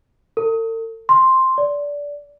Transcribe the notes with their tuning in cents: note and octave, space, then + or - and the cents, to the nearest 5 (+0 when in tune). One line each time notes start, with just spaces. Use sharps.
A4 +45
C6 +5
D5 -20